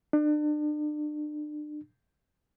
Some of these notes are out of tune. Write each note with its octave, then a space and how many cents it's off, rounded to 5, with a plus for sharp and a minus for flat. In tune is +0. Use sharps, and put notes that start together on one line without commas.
D4 +35